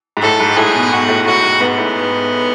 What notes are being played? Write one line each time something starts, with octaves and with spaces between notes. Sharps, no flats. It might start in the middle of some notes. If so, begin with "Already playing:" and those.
G#2
A2 A4
G#2
A2 G#4
B2
B2 F#4
A2
A2 F#4
G#2
G#2 B3
A2